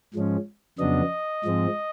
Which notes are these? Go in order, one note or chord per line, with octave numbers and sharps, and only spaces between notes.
G#2 F3 G#3 C#4
F2 C#3 F#3 B3 D4 D#5
G#2 F3 G#3 C4